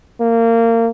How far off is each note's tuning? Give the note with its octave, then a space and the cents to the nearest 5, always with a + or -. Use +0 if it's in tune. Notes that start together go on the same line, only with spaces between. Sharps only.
A#3 -25